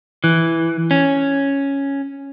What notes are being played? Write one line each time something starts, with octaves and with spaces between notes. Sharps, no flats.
E3
C#4